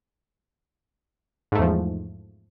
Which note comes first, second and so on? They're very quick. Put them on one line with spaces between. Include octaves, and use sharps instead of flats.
G#2 A3 E2 F3